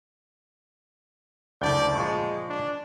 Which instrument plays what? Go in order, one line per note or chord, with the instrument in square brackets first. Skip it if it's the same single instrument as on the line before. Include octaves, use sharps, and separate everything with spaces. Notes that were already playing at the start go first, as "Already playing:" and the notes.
[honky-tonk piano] F#1 A5 G6 [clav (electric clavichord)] D2 [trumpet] D5
[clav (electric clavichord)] A#2 F3 [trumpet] G#3 [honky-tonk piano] C#6
[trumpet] D4